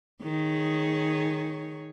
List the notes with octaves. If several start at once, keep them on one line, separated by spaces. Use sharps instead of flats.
D#3 G#4 C#5